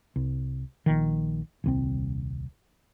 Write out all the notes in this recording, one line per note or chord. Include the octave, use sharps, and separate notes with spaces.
C2
A#1 D#3
D#1 C2 C4